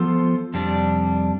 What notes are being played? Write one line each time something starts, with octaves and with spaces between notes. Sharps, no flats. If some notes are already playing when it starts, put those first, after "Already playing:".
Already playing: F3 B3 F4 A4 C5
F2 C3 G3 D4